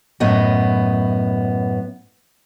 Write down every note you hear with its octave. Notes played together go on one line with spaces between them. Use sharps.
F#2 A2 B3 D#5